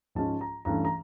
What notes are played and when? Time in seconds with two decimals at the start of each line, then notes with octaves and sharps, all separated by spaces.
0.15 G#2 F3 G#3 C#4 F4 A5
0.41 A#5
0.65 G2 E3 A3 C#4 A#5
0.85 A#5